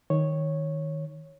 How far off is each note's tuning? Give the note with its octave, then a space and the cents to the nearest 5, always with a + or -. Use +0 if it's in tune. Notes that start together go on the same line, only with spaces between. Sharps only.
D#3 +0 C#5 -10